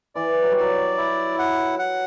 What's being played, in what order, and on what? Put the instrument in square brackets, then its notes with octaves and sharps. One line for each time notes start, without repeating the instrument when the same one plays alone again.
[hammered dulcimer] E3 [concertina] D5
[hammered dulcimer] F#3
G3
[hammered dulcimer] F#3 [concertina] D5
[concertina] E4
F#5
F#5